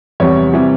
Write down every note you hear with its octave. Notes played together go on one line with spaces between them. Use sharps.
E2 C3 E3 G3 C#5
C3 E3 G3